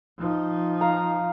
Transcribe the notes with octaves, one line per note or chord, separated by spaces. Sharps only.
F3 D#4
F5 A#5